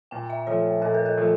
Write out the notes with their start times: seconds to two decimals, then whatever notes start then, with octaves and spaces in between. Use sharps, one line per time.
0.11 A#2 G5
0.30 E5
0.47 F3 A3 C#5
0.82 A#2 A4
0.94 A#4
1.05 A4
1.17 F3 A3